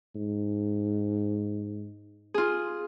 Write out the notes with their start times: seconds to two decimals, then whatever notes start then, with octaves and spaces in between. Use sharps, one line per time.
0.16 G#2
2.34 F4 G#4